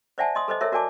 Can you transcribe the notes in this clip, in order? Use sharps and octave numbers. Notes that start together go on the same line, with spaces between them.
C5 D5 E5 F#5 G#5 A5
D#5 C6 D#6
A4 B4 C5 D#5
E4 A4 A#4 C#5 E5
F#4 A#4 D5 G#5 A5 D6